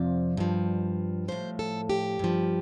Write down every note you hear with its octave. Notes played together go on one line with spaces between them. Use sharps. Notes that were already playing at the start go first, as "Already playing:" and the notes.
Already playing: F2 C3 F3 D5
G2 F3
A2 F3 C5
A4
G4
G2 F3